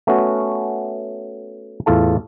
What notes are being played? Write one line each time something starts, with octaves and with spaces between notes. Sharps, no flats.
A3 B3 C#4 F#4
E2 A2 F4 A4 A5